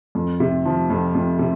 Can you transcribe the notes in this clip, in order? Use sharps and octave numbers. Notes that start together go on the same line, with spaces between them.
F2
C3
F3
F2
F2
C3